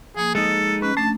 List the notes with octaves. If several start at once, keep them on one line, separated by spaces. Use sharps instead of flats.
F3 A#3 G#4
G#3 D#4 A4 G#5 D#6
C#4 B4
A3 D4 A5